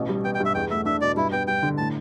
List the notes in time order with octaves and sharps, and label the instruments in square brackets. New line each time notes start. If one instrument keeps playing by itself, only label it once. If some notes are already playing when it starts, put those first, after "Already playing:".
Already playing: [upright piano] A1 B2
G3
[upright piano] B3 [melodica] G5
[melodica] G5
[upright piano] G2
[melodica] E5
[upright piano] E2 [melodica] G5
[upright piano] A3 [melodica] E5
[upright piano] D4 [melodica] E5
[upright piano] B2 [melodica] D5
[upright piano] G2 [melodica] E4
[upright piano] B3 [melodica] G5
[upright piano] G2 [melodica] G5
[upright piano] D3
[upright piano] A2 [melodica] A5